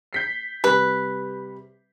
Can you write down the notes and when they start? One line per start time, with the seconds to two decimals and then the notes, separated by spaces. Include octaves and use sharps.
0.13 G6 B6 C7
0.64 C3 G3 B4